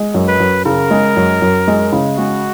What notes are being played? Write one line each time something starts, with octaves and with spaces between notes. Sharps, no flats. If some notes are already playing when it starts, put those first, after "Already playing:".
Already playing: G#3
F#2
B4
F#2
C#3 A#4
G#3
F#2
F#2
G#3
C#3
G#3 F#4